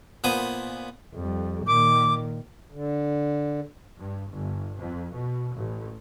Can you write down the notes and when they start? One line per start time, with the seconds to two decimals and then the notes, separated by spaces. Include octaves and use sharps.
0.24 A#2 B3 C5 G#5 D#6
1.15 F2 G3
1.67 A#2 D#3 D6
2.72 D3
3.97 G2
4.32 G1
4.79 F2
5.14 B2
5.55 A1